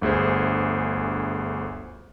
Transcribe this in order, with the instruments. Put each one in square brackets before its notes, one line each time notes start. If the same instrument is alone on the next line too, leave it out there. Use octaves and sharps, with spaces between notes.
[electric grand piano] G1 D2 G#4 C5